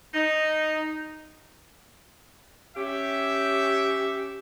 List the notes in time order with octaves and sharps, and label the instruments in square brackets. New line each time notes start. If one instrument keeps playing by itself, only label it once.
[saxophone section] D#4
[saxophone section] C#4 G4 [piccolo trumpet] E5